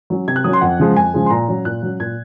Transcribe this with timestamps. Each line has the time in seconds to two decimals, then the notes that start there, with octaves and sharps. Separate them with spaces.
0.10 F#3 C#4
0.28 C3 G#6
0.36 F#6
0.44 F#3 C#4 D#6
0.53 C6
0.61 F2 F#5
0.79 C#3 F3 G#3
0.96 F2 G#5
1.14 C#3 F3 G#3
1.26 C6
1.30 A#2 A#5
1.48 F#3 C#4
1.65 A#2 F#6
1.82 F#3 C#4
2.00 A#2 G#6